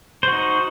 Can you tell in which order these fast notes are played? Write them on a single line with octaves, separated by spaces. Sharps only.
C5 F#4 D#4